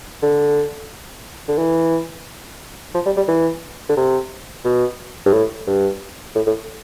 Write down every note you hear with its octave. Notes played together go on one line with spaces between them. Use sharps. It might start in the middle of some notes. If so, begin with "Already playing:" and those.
D3
D3
E3
F3
G3
G3
E3
D3
C3
B2
G2
A2
G2
A2
A2